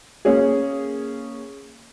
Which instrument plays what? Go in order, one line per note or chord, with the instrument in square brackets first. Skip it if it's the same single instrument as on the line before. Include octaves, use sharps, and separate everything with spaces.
[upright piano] A#3 C#4 G#4